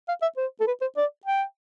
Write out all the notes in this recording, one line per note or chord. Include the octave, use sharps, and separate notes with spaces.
F5
E5
C5
A4
B4
C5
D5
G5